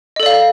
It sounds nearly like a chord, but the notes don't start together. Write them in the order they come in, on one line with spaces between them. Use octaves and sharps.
D#5 A4 D5 F5